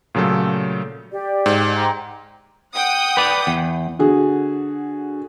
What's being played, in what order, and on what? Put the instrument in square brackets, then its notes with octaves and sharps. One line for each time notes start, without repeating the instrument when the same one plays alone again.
[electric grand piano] A#2 C#3 F#3 A3 A4
[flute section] G4 D5
[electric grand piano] G#2
[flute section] G5 A#5 C6
[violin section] F#5 G5 D#6
[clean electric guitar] B4 D5
E2
[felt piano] D3 F#4 G#4